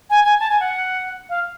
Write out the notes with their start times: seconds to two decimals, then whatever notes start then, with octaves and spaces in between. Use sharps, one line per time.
0.10 G#5
0.24 G#5
0.40 A5
0.50 G#5
0.60 F#5
1.29 F5